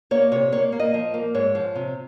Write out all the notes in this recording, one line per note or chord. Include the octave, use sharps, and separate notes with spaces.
A#3 C#5
C3 C#5
A#3 C#5
A#3
D#5
F3
A#3
G#2 C#5
F3
C3